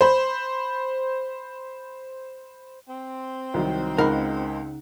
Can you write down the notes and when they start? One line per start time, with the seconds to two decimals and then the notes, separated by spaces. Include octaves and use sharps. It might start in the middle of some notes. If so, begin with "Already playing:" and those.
0.01 C5 B5
2.88 C4
3.54 C2 D#3 F#3
3.98 C#2 C#3 D#4 A#4 F5 F#5 B5